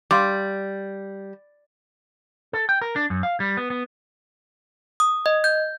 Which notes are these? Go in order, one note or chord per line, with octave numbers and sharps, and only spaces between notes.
G3 F5 C6 D6
A4
G5
A#4
D4
F#2
F5
G3
B3
B3
D#6
D#5
G6